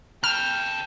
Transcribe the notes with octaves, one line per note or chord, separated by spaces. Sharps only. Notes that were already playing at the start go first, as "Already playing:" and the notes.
C#3 A4 G5 F6